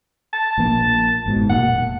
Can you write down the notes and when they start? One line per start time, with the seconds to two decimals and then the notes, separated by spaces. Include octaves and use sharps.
0.33 A5
0.57 A#1 F3 A#3
1.26 G1 G#2 B2
1.49 F1 A#2 A#3 F#5